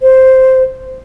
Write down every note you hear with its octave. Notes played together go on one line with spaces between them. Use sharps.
C5